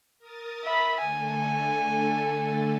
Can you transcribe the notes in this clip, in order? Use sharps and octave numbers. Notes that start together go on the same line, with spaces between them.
A#4 D#6 A6
E5 B5
D3 A3 A4 G#5